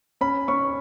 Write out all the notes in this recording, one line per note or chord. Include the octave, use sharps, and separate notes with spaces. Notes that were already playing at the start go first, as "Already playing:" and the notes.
C#4 B5
C#4 C#6